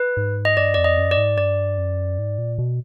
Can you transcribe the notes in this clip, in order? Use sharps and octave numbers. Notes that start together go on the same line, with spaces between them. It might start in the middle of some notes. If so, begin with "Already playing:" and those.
Already playing: B4
G#2
D#5
G2 D5
F2 D5
D#5
F#2
D5
G#2
G2 D5
F#2
G#2
A#2
B2